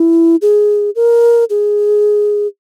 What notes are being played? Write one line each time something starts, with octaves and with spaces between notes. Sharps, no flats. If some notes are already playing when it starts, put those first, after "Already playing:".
Already playing: E4
G#4
A#4
G#4